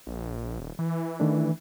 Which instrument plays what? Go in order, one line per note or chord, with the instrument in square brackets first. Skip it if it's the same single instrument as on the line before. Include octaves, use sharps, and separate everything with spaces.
[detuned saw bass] A#1
D#1
E3
[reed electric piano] D#3 A3 D4